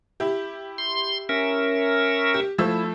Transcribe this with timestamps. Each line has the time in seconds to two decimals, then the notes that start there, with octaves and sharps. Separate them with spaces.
0.20 E4 G4
0.78 C6
1.29 C#4 A#4 E5
2.34 G4
2.58 F3 A3 E4 E6